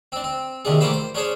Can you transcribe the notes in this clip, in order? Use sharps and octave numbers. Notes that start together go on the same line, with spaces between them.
C4 D4
C4
D#2 C3 D4 G#4
E3 A3 A#3 G4 B4 C5
C5
C#4 D4 G#4 C5 C#5